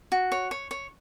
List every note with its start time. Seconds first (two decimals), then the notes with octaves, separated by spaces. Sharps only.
0.12 F#4
0.32 C#5
0.51 C#5
0.71 C#5